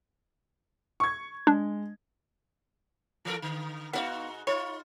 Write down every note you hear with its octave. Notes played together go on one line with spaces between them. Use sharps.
C#6 G#6
G#3 D4
E3 A4 A#4
D3
G#2 B3 D#4 F#4 D5 F5
D#4 F4 C#5